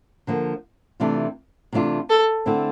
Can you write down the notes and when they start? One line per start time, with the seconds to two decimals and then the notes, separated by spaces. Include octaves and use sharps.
0.27 D3 F3 A#3
1.00 C3 E3 A3 D4 F4
1.73 C3 E3 A3 D4 F4
2.10 A4
2.46 D3 A3 C4 E4